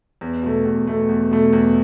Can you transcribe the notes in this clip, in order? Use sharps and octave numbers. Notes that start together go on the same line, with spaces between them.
E2
B2 A3
E2
B2 A3
E2
B2 A3
E2